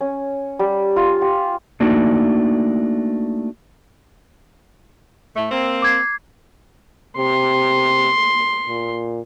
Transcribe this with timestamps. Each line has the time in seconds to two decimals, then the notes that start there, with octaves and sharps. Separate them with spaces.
0.01 C#4
0.59 G3
0.96 F4
1.22 G4
1.80 A3 A#3 D4 D#4 F#4
5.35 A2 A3
5.50 A#3 C4
5.82 D6 G#6 C7
7.17 C3 C6
8.68 A#2